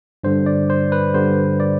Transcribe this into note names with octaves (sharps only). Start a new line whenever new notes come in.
G2 D3 G3 C5
D5
C5
B4
G2 D3 G3 C5
D5